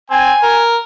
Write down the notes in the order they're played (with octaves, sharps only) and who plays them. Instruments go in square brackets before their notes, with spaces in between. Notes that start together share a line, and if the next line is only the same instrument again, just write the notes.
[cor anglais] C4 [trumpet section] G#5
[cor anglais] A#4